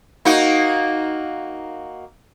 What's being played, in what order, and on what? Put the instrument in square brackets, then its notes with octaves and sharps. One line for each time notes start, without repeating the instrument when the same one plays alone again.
[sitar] A#3 D#4 F#4